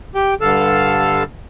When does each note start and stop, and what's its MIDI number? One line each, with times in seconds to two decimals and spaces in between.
0.15 0.34 67
0.15 0.34 79
0.41 1.23 43
0.41 1.23 50
0.41 1.23 69
0.41 1.23 77
0.41 1.23 88